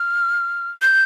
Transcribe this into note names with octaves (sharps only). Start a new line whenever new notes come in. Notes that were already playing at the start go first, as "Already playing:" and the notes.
Already playing: F6
G6